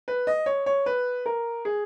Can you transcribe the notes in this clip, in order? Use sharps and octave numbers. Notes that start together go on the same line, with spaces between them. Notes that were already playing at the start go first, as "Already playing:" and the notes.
B4
D#5
C#5
C#5
B4
A#4
G#4